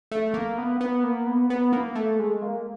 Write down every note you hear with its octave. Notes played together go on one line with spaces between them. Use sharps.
A3
A#3
B3
B3
A#3
B3
B3
A#3
A3
G#3
A#3